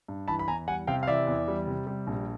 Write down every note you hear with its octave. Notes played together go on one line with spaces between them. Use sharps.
G2
E3 A5 B5
B5
E2 G#5 A#5
G3 F#5 G#5
C3 F5 G5
F5
E3 D5 E5
E2
G3
C3
G3
A#1